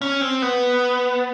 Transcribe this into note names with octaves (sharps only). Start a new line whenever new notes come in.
C#4
C4
B3